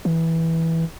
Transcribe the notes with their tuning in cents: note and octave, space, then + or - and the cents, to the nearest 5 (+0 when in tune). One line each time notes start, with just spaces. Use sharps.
E3 -10